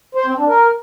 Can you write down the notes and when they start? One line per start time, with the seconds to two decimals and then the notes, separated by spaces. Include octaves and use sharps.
0.15 C5
0.26 C4
0.37 D4
0.48 A#4